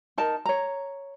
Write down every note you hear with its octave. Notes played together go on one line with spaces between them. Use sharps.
D#4 A#4 A5
C#5 A#5